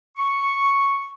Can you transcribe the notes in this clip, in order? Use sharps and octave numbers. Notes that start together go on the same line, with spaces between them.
C#6